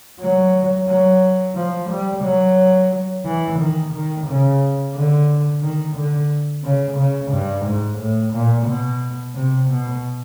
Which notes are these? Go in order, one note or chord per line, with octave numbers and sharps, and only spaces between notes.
F#3
F#3
F3
G3
F#3
E3
D#3
D#3
C#3
D3
D#3
D3
C#3
C#3
G2
G#2
A2
A#2
B2
C3
B2